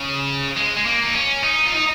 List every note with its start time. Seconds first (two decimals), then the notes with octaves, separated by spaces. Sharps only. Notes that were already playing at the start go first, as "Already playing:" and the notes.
Already playing: C#3
0.57 G#3
0.77 G#3
0.86 A#3
1.03 D#4
1.15 C#4
1.44 D#4
1.66 F4
1.74 D#4